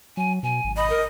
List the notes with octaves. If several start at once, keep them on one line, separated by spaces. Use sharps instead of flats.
F#3 G#5
B2 G#5
G#1
D#5 B5
A#4